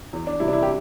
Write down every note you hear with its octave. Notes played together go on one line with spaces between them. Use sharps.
E2
D4
C3 G3 E4
D4
E4
G4